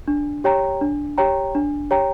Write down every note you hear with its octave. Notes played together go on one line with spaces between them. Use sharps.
D4
G4 C#5 G5 A#5
D4
G4 C#5 G5 A#5
D4
G4 C#5 G5 A#5